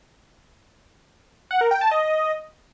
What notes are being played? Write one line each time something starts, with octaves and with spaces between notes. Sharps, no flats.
F#5
A#4
G5
A5
D#5